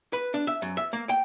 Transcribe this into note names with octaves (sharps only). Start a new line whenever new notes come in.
B4
D4
E5
F#2
E5
A#3
G5